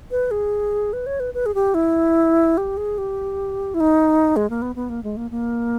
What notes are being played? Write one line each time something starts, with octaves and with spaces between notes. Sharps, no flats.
B4
G#4
B4
C#5
B4
B4
G#4
G4
E4
G4
G#4
G4
E4
D#4
G#3
A#3
B3
B3
A#3
G#3
A#3
A#3